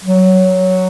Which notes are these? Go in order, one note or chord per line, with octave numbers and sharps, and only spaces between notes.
F#3